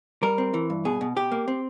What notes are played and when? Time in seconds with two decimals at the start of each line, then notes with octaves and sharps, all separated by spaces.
0.23 G3 A#4
0.38 C4
0.54 E3
0.70 G2
0.85 B2 G#4
1.01 B2
1.16 B2 G4
1.31 A#3
1.48 C4